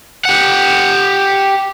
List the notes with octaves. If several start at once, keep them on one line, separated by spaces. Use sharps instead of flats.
G4 F#5